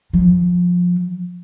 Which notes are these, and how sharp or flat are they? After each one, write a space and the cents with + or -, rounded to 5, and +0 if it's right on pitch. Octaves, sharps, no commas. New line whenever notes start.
F3 +25